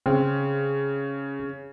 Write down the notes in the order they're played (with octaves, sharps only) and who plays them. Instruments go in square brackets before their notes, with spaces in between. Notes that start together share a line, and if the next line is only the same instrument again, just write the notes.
[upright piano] C#3 [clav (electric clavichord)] C4